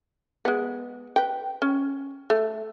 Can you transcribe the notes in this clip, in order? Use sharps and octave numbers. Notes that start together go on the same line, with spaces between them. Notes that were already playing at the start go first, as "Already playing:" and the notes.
G#3 B3
B4 G5
C#4
A3